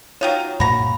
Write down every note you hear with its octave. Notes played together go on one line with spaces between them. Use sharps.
F#3 D#4 F4 C#5 F5 G5
G2 A#2 A#3 F#4 A#5 B5